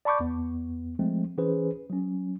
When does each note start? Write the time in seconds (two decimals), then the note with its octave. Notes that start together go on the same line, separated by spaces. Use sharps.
0.05 D5 A5 B5 C#6 D6 G6
0.19 E2 B3
0.99 F3 G#3 A3 C4
1.38 E3 C#4 G#4 B4 C5
1.90 F#3 C#4